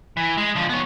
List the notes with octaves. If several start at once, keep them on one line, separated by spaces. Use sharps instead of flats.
E3
G#3
D3 F3
B3 C#5